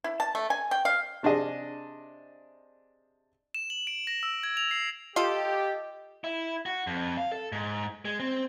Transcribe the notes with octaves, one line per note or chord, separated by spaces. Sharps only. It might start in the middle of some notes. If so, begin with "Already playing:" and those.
E4
A5
A3
G#5
G5
F5
C3 D4 G#4 D#5
E7
F#7
D7
A#6
E6
G#6
F7
C7
F4 G4 A4 D#5
E4
F#4
F2
F5
A4
G#2
G#3
C4